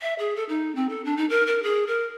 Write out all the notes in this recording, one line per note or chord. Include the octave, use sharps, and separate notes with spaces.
E5
G#4
A4
D#4
C4
A4
D4
D#4
A#4
A#4
G#4
A#4